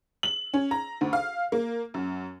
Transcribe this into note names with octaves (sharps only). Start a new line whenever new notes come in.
F#7
C#4
A#5
D2
F5
A#3
F#2